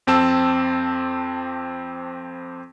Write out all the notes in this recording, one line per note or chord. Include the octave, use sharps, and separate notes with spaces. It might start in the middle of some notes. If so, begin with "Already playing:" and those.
F2 C4 A5 E6